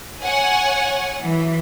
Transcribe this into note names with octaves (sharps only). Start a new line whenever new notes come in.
C#5 F#5 G#5
E3 F#3